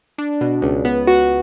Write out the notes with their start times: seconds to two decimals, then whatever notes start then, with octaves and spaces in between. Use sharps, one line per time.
0.18 D4
0.41 B2
0.62 C#2
0.85 B3
1.07 F#4